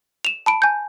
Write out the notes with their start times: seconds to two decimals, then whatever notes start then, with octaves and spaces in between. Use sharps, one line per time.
0.25 E7 F7
0.46 A5 B5 D7
0.62 G#5 G6